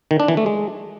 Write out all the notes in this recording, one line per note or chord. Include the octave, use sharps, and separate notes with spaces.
D#3
D4
E3
A3
G#3